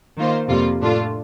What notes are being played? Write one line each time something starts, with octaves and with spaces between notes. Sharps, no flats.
D#3 A#3 F4 C5
F2 C3 G3 A#3 F4
A2 A3 D4 F4